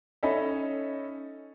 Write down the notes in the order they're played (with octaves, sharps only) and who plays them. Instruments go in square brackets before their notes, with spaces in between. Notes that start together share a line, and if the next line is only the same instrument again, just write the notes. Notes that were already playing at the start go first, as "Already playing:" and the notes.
[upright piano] C#4 D#4 A4 D#5 E5 B5